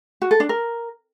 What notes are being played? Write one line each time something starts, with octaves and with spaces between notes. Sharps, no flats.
F#4
A4
D4
A#4